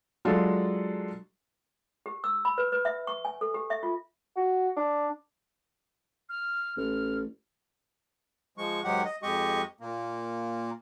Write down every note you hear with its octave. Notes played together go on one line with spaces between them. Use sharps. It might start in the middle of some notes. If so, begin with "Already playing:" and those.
F#3 G#3 D4 F4 A4
G4
E6
B5
B4
B4
E5
C#6
G#5
A4
G4
E5
F4
F#4
D4
F6
A1 F6
F3 G#3 C#6
G#2 D#3 F#3 G#3 G4 F#5
D#5
F2 G#3 G4 D#5 C#6
A#2 A#3